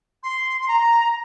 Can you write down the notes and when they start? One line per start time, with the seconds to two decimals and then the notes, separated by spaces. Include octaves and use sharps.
0.23 C6
0.61 C6
0.68 A#5